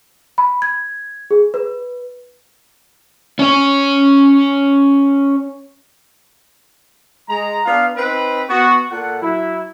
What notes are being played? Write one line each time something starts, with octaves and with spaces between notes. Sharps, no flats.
B5
G#6
G#4
B4
C#4 C#5
G#3 A#5
B3 D4 F4 F5
C4 D#4 B4
B3 F#4
A#2 A4 F#5
F#3 E4